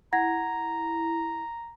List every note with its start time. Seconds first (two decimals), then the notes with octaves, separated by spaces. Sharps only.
0.13 E4 F#5 A#5 G#6 A#6